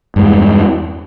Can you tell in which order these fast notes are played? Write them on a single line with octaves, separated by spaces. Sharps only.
G2 G#3 E2